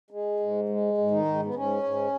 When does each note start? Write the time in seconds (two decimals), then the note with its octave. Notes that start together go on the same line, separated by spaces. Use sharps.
0.11 G#3
0.40 G#2
0.69 G#3
0.98 G#2
1.11 D#3 D#4
1.25 G#2
1.45 B3
1.54 G#2 C#4
1.83 G#2